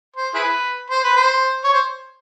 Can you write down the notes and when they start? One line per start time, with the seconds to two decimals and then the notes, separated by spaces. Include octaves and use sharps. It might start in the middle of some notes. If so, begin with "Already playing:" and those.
0.16 C5
0.34 E4 G#4 B4
0.90 C5
1.03 B4
1.16 C5
1.64 C#5
1.73 C5